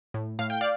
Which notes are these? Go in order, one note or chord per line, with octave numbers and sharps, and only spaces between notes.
A2
A2 F5
G5
D5 F5